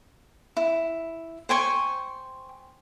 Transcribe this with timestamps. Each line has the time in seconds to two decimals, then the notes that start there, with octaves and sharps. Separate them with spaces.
0.57 E4
1.49 C5 G5 G#5 C#6